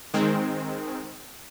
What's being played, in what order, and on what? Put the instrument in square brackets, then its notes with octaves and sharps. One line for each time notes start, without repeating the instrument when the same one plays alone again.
[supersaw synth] D#3 G#3 C4